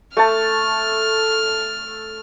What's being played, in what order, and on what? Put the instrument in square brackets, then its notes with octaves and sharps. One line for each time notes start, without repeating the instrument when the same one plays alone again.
[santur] A3 A5 [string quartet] F6